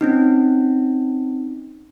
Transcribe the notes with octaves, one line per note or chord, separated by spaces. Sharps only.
C4 C#4 D#4